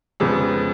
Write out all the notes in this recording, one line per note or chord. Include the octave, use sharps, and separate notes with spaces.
F1 F2 C#3 G#3 B3